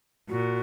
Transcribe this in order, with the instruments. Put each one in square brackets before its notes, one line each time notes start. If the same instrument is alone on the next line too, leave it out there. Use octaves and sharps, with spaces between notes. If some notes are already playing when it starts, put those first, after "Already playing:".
[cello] A#2 [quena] F#4